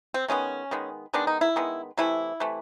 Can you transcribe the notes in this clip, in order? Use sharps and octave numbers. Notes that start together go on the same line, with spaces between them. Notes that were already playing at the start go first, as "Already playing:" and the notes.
C4
D#3 G#3 B3 C#4
D#3 G#3 B3
D#3 G#3 B3 D4
D#4
E4
D#3 G#3 B3
C3 E3 A3 E4
C3 E3 A3